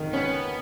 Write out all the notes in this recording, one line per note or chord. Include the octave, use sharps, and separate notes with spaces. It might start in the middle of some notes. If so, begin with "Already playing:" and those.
Already playing: D#3
B3 C#4